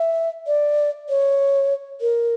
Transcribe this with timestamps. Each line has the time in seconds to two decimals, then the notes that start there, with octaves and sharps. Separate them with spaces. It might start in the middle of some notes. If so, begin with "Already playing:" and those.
Already playing: E5
0.47 D5
1.09 C#5
2.01 A#4